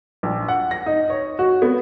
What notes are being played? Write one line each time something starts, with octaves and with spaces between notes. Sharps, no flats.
A#1
F#5
A#6
D#4
C#5
F#4
B3